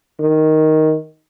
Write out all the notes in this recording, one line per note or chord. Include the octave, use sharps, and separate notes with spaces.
D#3